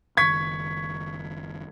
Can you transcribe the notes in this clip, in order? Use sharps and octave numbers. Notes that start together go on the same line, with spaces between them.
F#1 D#3 C#6 G#6 B6